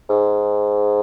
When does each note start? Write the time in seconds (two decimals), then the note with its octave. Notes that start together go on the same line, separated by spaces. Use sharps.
0.10 G#2